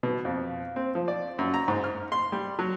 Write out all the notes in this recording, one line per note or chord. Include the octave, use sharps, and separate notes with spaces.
B2
F2
C4
F3
D5
F#2
A#5
G#2
F6
C6
G3
F#3